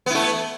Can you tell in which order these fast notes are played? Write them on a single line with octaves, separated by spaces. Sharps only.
B3 E4 A3